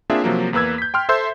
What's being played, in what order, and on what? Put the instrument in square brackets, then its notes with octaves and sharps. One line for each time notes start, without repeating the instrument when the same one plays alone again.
[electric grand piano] A#3 C4 D4 F4 G#4 E5
C3 F3 F#3 A#3
E2 A#3 B4 E6 G#6
G6 B6
G5 C6 F6
A4 C5 E5 C6 E6 G6